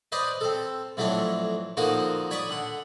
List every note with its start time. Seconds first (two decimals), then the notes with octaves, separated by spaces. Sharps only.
0.12 B4 C5 D5 D#5 B5
0.41 C4 A4
0.97 F2 E3 F#3 A3 D4 C#5
1.77 D3 F3 A#3 D#4 F#4
2.31 C#5 D5 B5 C#6 D#6
2.49 D3 F#5